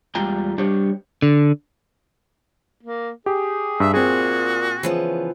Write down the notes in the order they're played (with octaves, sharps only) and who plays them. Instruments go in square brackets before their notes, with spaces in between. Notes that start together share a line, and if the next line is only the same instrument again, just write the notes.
[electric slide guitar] E2 G3 G#3 F4 G5 A#5
G3 D4 G4 C5 C#5
D3
[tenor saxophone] A#3
[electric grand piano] G4 [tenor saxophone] G#4
[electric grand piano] G2 [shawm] E5
[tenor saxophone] A#2 [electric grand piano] C4 G#4 [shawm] F#4
[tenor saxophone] C#3 [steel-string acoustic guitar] E3 F3 B3